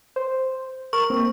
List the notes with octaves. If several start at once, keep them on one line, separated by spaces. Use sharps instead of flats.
C5
A#4 C#6
A#3 C4